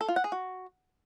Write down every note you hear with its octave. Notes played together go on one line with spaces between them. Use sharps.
A4
F4
F#5
G#4
F#4